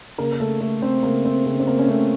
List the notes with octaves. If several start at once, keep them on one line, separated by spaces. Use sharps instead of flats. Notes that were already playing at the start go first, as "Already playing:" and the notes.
C#3 A#3 A#4
A#4
A3 A4
A3 A4
C4
C#3 A#3
C4
C#3 C4
C4
A#3
C#4
A3 C4